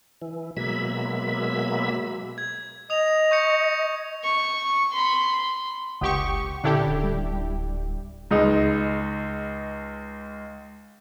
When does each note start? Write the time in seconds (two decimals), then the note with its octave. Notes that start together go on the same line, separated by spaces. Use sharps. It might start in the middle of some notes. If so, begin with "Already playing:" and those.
0.22 E3
0.57 B2 F#3 G#3 A#3 E5 B5
2.38 G#6
2.90 D#5 D#6 F7
3.31 C#6 G6 C#7
4.24 C#6
4.92 B5 C6
6.01 F#1 C#2 G4 F#5 C6 C#6 D#6
6.64 A#2 D3 C#4 D4 E4 G4 A4
6.86 D1
7.04 D2 G3
8.31 C#2 G#3 D#4